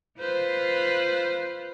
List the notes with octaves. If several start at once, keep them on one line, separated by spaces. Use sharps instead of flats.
F4 B4 C5